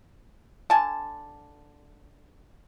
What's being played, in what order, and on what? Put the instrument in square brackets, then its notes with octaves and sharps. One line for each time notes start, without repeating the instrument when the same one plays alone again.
[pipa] D3 G#5 A5